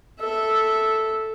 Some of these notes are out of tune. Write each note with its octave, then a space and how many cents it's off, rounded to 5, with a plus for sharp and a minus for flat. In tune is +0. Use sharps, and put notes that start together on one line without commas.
A4 +0 E5 -5